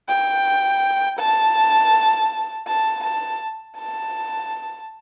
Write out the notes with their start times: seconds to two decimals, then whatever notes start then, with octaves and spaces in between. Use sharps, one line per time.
0.08 G5
1.19 A5
2.68 A5
3.04 A5
3.78 A5